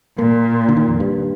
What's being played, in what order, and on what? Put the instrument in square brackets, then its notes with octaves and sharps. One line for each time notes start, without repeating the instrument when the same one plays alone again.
[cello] A#2 [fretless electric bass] A#3
[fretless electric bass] D3
D#3
F2
G2